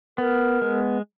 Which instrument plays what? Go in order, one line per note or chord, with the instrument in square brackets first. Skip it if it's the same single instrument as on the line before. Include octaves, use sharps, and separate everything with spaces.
[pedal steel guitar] B3 [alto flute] A#4
[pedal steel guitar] G#3